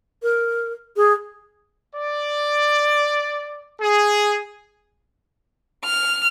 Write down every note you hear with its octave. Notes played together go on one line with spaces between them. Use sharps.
A#4
G#4
D5
G#4
F6